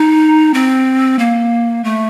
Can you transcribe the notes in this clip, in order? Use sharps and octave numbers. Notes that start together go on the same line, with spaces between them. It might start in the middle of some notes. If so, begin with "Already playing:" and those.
Already playing: D#4
C4
A#3
A3